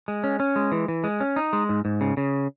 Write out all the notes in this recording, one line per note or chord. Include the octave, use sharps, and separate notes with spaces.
G#3
C#4
C#4
G#3
E3
E3
G#3
C#4
D#4
G#3
G#2
G#2
C#3
C#3